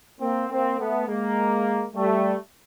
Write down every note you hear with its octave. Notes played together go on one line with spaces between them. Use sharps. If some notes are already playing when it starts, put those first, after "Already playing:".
A#3 C4
A#3 C4
A3 B3
G#3 A#3
G3 A3